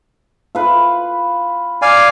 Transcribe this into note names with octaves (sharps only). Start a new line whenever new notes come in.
F4 B4
D5 F5 G#5